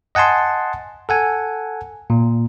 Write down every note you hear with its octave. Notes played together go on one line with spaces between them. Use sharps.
D#5 F#5 G#5 A5 C6
A4 F#5 G#5
A#2